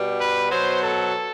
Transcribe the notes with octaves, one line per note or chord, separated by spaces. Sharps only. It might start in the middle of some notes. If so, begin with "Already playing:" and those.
Already playing: B2 G3
B4
B2 F#3 C5
A4